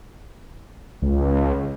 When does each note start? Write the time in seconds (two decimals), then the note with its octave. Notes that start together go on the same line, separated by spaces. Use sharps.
1.02 C#2